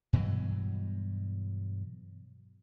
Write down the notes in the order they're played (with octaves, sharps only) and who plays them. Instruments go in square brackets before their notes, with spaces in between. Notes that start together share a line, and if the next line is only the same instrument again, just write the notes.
[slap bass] G2 B2 E3 F#3